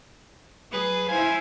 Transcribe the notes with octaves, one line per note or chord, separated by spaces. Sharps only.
F#3 G#4 B4
E4 C5 F5 G#5